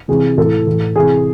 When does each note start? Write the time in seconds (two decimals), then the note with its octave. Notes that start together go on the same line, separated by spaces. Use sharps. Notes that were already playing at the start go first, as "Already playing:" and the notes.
0.08 C3 E3 G#4
0.38 A2 E3 A4
0.67 A2 E3
0.95 C3 E3 G#4